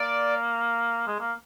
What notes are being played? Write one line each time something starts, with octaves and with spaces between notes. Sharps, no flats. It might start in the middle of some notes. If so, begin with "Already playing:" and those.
Already playing: A#3 D5
G#3
A#3